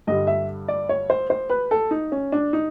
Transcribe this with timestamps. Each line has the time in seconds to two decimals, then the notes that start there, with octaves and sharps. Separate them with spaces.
0.07 G2 D3 G3 D#5
0.27 E5
0.68 D5
0.89 C#5
1.10 C5
1.30 C5
1.50 B4
1.71 A4
1.91 D#4
2.12 C#4
2.32 D4
2.53 D#4